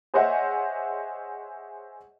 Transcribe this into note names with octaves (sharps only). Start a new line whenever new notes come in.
G#4 C5 C#5 D#5 E5 F#5